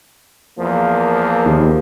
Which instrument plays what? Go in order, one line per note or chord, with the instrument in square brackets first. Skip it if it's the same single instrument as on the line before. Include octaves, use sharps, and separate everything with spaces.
[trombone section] E2 F3 A#3
[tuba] D#2